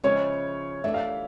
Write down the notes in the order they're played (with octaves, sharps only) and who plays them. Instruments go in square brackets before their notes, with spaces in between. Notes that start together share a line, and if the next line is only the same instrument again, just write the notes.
[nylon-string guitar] C#3 F3 G#3 C#4 E4 [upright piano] C#5
[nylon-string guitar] E3 A3 D4 [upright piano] E5
[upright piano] F5